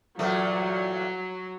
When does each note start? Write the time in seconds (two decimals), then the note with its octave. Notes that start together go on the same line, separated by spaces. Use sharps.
0.19 E2 A#2 F#3 A3